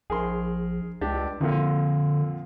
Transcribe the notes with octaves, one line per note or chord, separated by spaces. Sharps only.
A#1 G#4 A#4 C6
C#2 D4 G4
F2 A#2 D3